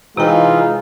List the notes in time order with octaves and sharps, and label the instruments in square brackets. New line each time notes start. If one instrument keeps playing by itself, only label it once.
[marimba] C3 G5 [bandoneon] E3 D#4 [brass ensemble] G#3 F4